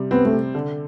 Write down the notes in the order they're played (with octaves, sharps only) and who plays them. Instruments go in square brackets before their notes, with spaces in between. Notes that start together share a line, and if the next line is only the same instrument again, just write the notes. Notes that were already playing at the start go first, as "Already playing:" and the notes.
Already playing: [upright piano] C3 G3
[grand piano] B3 [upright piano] C4
[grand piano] A3
[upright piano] C3
D3